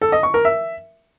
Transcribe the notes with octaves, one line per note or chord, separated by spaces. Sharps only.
A4
D#5
C#6
A#4
E5